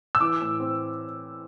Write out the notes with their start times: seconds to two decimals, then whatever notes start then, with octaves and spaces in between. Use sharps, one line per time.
0.15 E6
0.20 E3 D6
0.40 A2
0.60 C4